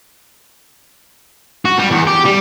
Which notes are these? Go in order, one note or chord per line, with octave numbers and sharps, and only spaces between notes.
F#4
G3
E2
G4
G3